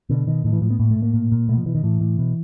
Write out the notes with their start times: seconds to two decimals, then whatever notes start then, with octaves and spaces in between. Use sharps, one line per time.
0.10 B2 D3
0.27 B2 D#3
0.44 A2 D#3
0.53 E3
0.62 A2 F3
0.70 B3
0.79 A2 A#3
0.91 A3
0.96 A2
1.02 A#3
1.14 A#2
1.32 A#2
1.48 B2 A3
1.57 F3
1.66 B2 E3
1.75 D#3
1.83 A2 E3
2.01 A2
2.18 B2